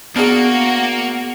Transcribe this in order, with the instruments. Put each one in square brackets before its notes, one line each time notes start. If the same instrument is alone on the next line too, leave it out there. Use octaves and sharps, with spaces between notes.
[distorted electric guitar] A#3 [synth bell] B3 F6 [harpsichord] D4 G#4 [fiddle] F#4 F#5